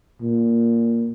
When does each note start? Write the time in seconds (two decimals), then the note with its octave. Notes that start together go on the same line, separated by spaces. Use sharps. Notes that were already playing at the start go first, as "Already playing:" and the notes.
0.21 A#2